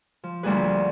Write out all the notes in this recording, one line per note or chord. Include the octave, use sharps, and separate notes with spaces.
F3
D2 F3 G3 A#3 G#4 B4